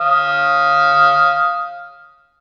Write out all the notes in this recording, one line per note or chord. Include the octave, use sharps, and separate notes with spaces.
F5 D#6